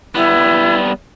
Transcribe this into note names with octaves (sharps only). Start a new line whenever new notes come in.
G3 B3 E4